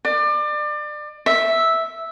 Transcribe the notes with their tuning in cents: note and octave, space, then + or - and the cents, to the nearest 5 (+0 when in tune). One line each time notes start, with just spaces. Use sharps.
D5 +30
E5 -5